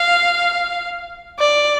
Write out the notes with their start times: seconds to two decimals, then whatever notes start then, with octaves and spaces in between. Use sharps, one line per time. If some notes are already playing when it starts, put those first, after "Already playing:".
Already playing: F5
1.39 D5